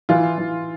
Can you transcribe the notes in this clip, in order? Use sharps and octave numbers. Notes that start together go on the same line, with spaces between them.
E3 F4
E3